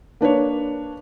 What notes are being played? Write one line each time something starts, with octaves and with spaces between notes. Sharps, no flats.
A#3 D4 B4 C#5